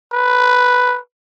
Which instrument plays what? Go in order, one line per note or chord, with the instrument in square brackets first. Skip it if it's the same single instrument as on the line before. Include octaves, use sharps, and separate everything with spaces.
[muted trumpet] B4